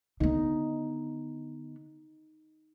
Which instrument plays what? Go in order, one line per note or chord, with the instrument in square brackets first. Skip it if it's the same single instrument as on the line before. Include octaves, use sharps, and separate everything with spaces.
[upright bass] D3 B3 [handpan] D#4